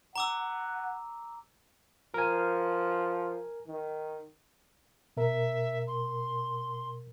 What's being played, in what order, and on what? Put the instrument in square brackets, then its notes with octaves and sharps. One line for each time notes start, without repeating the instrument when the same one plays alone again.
[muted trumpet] F#5 [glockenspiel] A#5 D6 E6
[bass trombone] F3 [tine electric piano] A#4 G#5
[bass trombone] D#3
[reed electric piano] B2 A#4 [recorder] E5
[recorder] C6